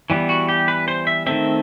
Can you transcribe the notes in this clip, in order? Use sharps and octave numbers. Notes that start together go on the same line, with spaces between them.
E3 G3 B3
F#4
G4
B4
C5
E5
D#3 A3 C4 E5